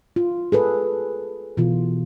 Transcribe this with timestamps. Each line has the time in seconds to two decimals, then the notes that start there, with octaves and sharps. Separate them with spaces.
0.16 F4
0.52 G#4 A4 B4
1.57 B2 E3 F4